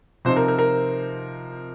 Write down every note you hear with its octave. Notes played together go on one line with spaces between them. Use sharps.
C3 F3 C4 D#4 C5
A#4
A#4
A#4